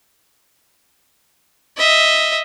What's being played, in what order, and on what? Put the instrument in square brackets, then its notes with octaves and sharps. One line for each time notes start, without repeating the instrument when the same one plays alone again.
[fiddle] D#5 E5